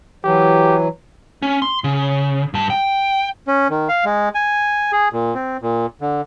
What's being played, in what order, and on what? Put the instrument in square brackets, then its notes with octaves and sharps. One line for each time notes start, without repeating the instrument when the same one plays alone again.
[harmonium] E3 F#3 [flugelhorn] G4
[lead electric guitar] C#4
C6
C#3
G2 A5
G5
[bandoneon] C#4
D#3
F5
G#3
G#5
G#4
A#2
C4
A#2
D3